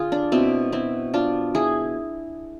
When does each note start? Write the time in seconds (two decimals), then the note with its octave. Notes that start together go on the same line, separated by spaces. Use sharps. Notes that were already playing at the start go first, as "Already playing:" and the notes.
Already playing: D3 F4 G#4
0.12 D4
0.32 B2 B3 C4 E4
0.72 C4 E4
1.14 D4 F4
1.55 E4 G#4